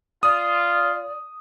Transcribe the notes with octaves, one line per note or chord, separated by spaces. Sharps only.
F4 D5 D#6